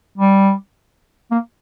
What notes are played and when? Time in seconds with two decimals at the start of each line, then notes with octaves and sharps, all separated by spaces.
0.18 G3
1.31 A#3